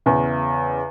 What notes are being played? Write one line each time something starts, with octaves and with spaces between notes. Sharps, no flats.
E2 C#3